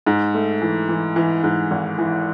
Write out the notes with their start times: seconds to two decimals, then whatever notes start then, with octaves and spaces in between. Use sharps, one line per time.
0.07 G#2
0.34 A3
0.62 E3
0.89 E3
1.16 E3
1.44 G#2
1.71 G#1
1.98 E3